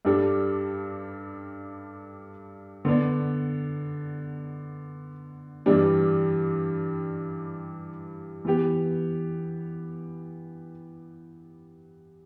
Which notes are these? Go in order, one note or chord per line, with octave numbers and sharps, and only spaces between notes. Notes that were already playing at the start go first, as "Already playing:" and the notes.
G2 G3 D4 A4
D3 B3 D4
G2 E3 G3 D4
E3 B3 G4